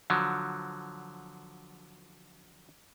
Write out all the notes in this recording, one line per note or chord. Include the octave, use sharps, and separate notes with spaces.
D3 F3 F#3